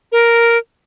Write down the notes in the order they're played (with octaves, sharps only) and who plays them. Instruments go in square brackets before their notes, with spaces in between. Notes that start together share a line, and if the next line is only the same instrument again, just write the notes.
[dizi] A#4